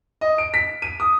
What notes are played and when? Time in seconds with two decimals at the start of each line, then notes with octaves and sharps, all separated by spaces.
0.21 D#5
0.38 D7
0.54 B6
0.82 D#7
1.00 D#6